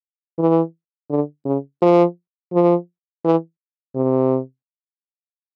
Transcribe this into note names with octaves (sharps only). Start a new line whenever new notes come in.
E3
D3
C#3
F3
F3
E3
C3